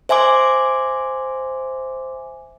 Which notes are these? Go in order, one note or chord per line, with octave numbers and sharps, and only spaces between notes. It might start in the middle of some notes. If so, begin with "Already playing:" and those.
C5 E5 G#5 C6 D6